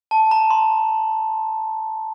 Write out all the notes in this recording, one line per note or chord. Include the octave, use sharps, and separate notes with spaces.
A5
A#5
C6